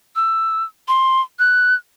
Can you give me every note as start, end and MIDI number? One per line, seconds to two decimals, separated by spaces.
0.16 0.64 88
0.88 1.21 84
1.39 1.75 90